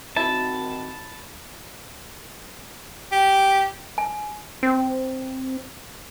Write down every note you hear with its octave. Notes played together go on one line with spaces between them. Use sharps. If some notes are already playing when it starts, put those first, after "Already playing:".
D#3 C4 E4 F#4 A5
G4
G#5
C4